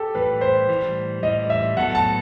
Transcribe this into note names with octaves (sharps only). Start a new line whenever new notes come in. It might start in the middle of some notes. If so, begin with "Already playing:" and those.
Already playing: G4 A4
A2 E3 G3 B4
C5
A2 E3 G3
A2 E3 G3 D#5
E5
A2 F#3 B3 F#4 A4 F#5
A5